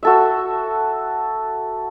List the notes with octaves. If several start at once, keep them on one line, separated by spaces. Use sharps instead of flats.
F#4 A4 E5